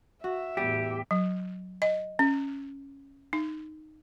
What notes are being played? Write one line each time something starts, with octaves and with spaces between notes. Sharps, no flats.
F#4 E5
E2 A2 G3 G4
F#3
D#5
C#4
D#4